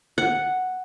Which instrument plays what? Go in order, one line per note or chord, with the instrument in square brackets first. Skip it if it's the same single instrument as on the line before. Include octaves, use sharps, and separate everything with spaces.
[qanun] F#5